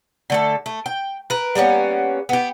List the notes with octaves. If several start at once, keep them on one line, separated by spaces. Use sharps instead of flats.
D3 A3 A4
A3
G5
A#4 B4
G3 A#3 B3 C#4
B3 G4